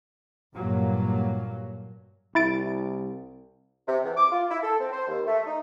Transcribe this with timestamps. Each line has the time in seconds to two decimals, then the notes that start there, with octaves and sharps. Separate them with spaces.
0.54 G2 A#2 F#3 A#3
2.35 C2 E4 A6 D7
3.88 C3
4.03 E2
4.17 D6
4.32 F4
4.50 E4
4.62 A4
4.80 C4
4.92 C5
5.07 D#2
5.26 A3
5.45 D#4